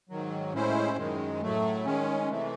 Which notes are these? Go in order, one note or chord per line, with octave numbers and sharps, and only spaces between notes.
G#2 D#3 F#3
A2 G#3 C#4 E4 C5
F#2 D#3 G#3
A2 F#3 A3
D#3 G#3 C#4
C3 E3 A3